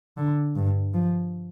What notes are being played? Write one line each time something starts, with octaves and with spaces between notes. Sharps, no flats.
D3
G2
F3